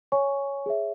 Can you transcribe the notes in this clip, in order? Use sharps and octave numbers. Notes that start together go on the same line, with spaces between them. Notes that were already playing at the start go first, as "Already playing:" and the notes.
C#5 G#5 C#6
G#4 C#5 E5